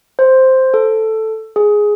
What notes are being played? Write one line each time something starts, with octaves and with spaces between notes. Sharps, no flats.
C5
A4
G#4